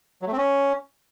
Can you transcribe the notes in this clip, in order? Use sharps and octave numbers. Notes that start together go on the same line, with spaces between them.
F#3
A3
C4
C#4